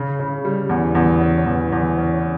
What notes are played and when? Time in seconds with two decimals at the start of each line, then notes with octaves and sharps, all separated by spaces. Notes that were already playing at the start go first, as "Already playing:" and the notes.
Already playing: C#3
0.19 C#3
0.45 G3
0.69 E2
0.95 E2
1.21 C#4
1.46 E2
1.72 E2
1.97 C#4